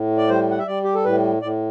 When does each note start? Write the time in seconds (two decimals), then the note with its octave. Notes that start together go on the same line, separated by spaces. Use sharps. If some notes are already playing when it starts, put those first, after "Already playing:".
Already playing: A2
0.18 D5
0.29 G3 C5
0.51 F#5
0.58 E5
0.67 G3 D5
0.84 G4
0.95 A4
1.05 A2 B4
1.42 A2 D5